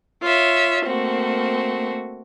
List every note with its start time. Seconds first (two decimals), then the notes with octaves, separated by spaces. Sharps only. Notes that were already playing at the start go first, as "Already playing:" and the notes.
0.22 F4 C#5 E5
0.86 A3 A#3 C4 F#4